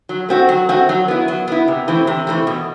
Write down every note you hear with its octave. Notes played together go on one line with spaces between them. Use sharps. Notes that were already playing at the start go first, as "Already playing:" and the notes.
F#3
A3 C4 F#4
F#3
A3 C4 F#4
F#3
B3 E4
F#3
B3 E4
C3
E3 A3 C4
C3
E3 A3 C4
B2